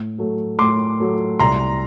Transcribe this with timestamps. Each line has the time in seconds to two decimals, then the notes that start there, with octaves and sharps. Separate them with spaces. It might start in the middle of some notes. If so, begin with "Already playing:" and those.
Already playing: A2
0.18 F#3 A3
0.59 A2 C6 D6
1.00 F#3 A3
1.39 C2 A#5 C6